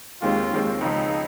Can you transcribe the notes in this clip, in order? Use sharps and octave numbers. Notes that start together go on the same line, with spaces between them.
D#2 D#3 G#3 C4 F4 G4
D#2 D#3 G#3 C4 G4
C#2 C#3 F3 D#4